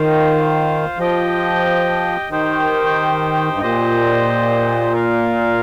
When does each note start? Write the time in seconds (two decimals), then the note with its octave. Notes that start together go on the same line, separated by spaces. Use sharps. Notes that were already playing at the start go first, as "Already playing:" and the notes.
Already playing: D#3 F4 C5 F5
0.98 F3 G4 D#5 G5
2.30 D#3 D#4 G4 C5 G5
3.54 G2
3.61 A#2 G4 C5 D#5
4.93 F4 A#4 F5